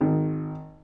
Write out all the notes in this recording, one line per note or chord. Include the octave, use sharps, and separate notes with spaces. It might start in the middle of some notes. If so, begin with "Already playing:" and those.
G#1 D#3